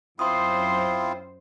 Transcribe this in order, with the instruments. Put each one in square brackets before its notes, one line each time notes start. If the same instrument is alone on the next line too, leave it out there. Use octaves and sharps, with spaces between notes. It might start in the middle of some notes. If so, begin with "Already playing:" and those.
[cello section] F#2 C5 [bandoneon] C4 E4 F4 [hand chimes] C6 D#6